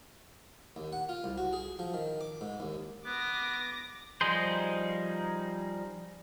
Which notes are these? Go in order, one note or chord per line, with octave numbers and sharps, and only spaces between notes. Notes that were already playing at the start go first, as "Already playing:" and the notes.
D#2
F#5
F4
C2
F#4
G#4
F3
D#3
D6
G#2
D#2
B3 D6 A#6
F3 G3 D#4 G#4 C5